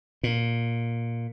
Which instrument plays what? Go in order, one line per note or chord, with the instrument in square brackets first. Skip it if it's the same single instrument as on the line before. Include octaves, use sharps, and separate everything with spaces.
[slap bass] A#2